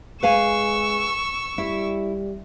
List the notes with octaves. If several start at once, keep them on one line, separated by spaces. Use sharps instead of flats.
G#3 B4 F5 G#5 C#6 E6
G3 E4